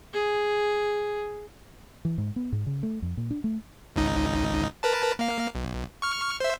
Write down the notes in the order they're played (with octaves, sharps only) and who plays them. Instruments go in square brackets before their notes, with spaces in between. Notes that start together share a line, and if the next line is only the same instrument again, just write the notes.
[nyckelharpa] G#4
[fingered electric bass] E3
G#2
B3
G#2
C#3
A3
F2
A#2
D4
A3
[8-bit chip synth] G#1 C#2 D#4
A#4 B4 A5
A#3 F5
B1
C#6 F6
C5 E5